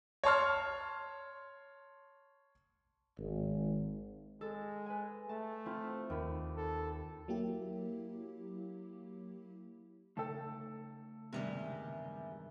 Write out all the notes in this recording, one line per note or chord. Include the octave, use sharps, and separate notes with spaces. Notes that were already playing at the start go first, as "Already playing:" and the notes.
C#5 A5 C6 F6
G#1
G#3 A4
B4 G#5
A3 A5
C4 E4 F4
D#2 B5
A4
F#3 A#3 E4 G4
C#3 A3 D#4 A4 G5 A5
E2 G2 C3 D#3 G3 G#3